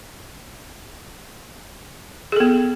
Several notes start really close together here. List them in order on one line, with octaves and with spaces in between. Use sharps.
G#4 A4 B3